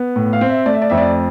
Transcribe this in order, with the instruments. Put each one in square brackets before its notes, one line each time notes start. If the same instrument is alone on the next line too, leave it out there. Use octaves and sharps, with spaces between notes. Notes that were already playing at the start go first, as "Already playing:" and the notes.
Already playing: [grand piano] B3
A2
F5
C4
E5
A3 D5
E5
D5
F2 E5
D5